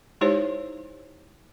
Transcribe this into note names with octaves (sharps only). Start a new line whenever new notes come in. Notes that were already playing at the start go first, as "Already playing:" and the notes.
G#3 D#4 E4 G4 C5 C#5